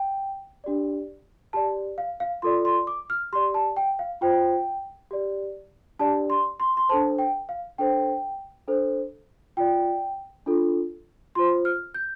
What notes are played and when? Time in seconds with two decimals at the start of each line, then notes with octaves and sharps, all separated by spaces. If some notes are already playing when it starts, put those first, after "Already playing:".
Already playing: G5
0.64 D4 G4 D5
1.53 G4 D5 A5
1.98 F5
2.20 F5
2.42 F4 A4 D5 C6
2.65 C6
2.87 D6
3.10 F6
3.32 G4 C6
3.35 D5
3.54 A5
3.77 G5
3.99 F5
4.21 F4 C5 G5
5.11 G4 D5
5.99 D4 G4 D5 A5
6.30 C6
6.60 C6
6.77 C6
6.89 D4 A4 C5 A5
7.19 G5
7.49 F5
7.78 D4 A4 C5 G5
8.68 D4 A4 C5
9.57 F4 D5 G5
10.46 D4 F4 A4
11.35 F4 C5 C6
11.65 F6
11.94 G6